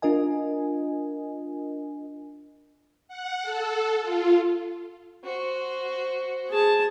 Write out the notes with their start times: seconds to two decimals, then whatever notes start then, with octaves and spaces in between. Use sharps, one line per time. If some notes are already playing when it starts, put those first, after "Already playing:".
0.02 D4 F4 A#4 D#5 G#5
3.08 F#5
3.43 A4
4.02 F4
5.24 F#4 C5
6.51 G#4 A5